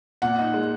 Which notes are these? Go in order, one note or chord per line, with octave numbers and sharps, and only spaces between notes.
A#2 F#5
D#4
G#3